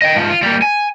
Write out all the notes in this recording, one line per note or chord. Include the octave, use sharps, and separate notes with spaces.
D#5 G5
G#2 F3
F4
G3 A#3
G#5